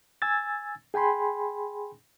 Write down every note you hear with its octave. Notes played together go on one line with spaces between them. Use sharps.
G#5 E6 G#6 A6
G#4 G5 G#5 B5 C6